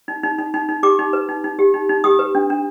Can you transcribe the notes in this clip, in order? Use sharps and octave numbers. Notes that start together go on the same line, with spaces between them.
D#4
D#4
D#4
D#4
D#4
G4 D6
D#4
B4
D#4
D#4
G4
D#4
D#4
G4 D#6
B4
D4
D4